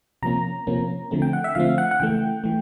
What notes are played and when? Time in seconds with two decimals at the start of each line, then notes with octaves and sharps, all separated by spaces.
0.23 C3 F3 A#3 C#4 A#5
0.67 C3 F3 A#3 C#4
1.11 D3 F3 A3 C4
1.22 G5
1.33 F#5
1.44 E5
1.55 D3 F3 A3 C4 F5
1.78 F#5
1.91 F#5
2.00 C#3 E3 A3 G5
2.44 E3 A3